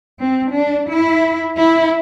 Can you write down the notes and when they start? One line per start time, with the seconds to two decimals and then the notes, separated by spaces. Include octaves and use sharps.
0.19 C4
0.53 D4
0.89 E4
1.58 E4